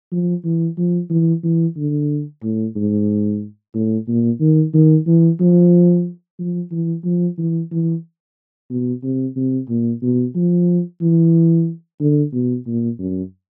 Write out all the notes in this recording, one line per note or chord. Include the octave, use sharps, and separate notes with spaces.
F3
E3
F3
E3
E3
D3
A2
G#2
A2
A#2
D#3
D#3
E3
F3
F3
E3
F3
E3
E3
B2
C3
C3
A#2
B2
F3
E3
D3
B2
A#2
F#2